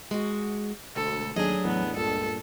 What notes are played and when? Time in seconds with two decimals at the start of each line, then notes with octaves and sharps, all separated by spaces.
0.11 G#3 F#4
0.96 E1 D2 A4
1.36 D#2 F#3 D4 G#4 D#5
1.65 E2 A2 B3
1.96 C#2 G2 A#2 A4